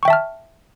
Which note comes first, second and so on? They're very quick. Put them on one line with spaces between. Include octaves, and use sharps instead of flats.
C#6 G5 E5 A5 F6